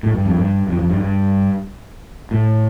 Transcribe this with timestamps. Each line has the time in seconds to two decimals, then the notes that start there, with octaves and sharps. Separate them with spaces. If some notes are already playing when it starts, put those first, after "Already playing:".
0.03 A2
0.14 G2
0.26 F2
0.37 G2
0.68 F2
0.79 F2
0.89 G2
1.00 G2
2.31 A2